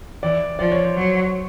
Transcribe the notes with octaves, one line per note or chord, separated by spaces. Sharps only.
E3 D5
F3 D5
C#5
C5
F#3